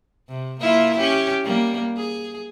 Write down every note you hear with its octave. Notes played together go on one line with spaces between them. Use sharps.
C3
A#3 E4 F4
C#4 G4
G3 A#3
G#4